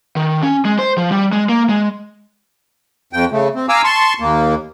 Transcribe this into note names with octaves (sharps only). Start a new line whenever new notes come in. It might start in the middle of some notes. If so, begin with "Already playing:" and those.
D#3
C#4
G#3
C5
F3
G3
G#3
A#3
G#3
F2 G5
C#3 A3
C4
F5 G#5 A#5 D6 E6
A5 C6 C#6
D#2 A#3